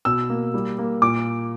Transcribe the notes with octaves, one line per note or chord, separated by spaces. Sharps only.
B2 E6
A#3
G3
A#3
A#2 D6